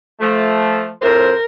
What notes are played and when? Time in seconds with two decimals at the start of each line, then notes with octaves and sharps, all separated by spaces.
0.21 F3 A3
1.02 F2 A2 A#4 C5